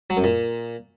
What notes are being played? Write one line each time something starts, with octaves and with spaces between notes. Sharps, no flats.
F#3
F#2
A#2